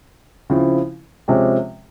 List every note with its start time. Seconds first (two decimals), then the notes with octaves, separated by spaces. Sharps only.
0.50 C#3 F3 C4 E4
1.28 C3 F3 G#3 C#4 G4